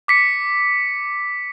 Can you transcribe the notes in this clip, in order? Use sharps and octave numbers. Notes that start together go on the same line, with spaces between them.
D6 B6 C#7